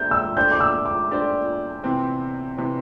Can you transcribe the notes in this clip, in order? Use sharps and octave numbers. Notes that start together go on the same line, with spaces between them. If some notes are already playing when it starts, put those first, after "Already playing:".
Already playing: A3 D4 G4 C5 G6
E6
A3 D4 G4 C5 G6
D6
E6
D6
A3 D4 G4 C5
C3 E3 C4
C3 E3 C4